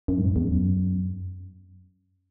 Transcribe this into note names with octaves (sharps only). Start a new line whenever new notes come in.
F#2
G#2
E2
F#2